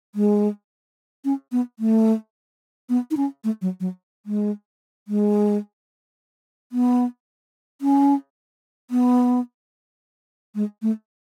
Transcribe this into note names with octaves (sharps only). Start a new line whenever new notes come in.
G#3
C#4
B3
A3
B3
D#4
C#4
A3
F#3
F#3
G#3
G#3
B3
C#4
B3
G#3
A3